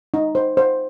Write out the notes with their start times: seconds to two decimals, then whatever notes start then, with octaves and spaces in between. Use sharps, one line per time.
0.14 D#4
0.35 C5
0.57 C5